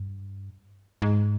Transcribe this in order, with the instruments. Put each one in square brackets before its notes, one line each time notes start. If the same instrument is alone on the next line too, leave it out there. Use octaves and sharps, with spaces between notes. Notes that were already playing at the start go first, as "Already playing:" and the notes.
Already playing: [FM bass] G2
G#2